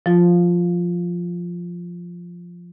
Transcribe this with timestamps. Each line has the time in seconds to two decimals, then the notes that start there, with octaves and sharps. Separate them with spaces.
0.06 F3 F4